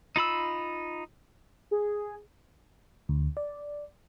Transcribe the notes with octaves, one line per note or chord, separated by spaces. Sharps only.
D#4 F4 B5 E6
G#4
D2
D5